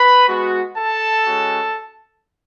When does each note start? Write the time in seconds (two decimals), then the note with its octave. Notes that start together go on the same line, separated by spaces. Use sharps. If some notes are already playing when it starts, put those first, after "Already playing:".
Already playing: B4 B5
0.28 G#3 B3 F#4
0.77 A4 A5
1.26 G#3 C#4 F#4